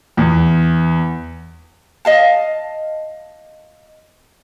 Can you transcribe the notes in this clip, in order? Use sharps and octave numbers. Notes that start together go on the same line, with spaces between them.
E2
D#5 F5 A5